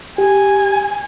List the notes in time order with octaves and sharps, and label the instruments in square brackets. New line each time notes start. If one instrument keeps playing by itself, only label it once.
[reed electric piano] G4 [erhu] G#5